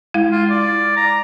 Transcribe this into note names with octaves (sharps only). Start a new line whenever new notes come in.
G#3 E4 F5
F4
D5
A#5